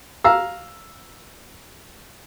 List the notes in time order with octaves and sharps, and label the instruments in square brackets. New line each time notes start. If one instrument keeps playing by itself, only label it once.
[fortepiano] F5 A#5 E6